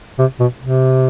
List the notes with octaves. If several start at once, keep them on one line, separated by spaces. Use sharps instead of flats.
C3
B2
C3